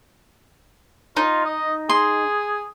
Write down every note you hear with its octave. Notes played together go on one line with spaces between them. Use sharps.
D#4 F4
D#5
G#4 C6